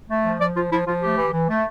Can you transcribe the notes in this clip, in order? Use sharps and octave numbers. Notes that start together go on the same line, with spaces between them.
A3
F3
F3 D5
F3 F4
F3 E4
F3 F4
A3 G4
E3
E3
A3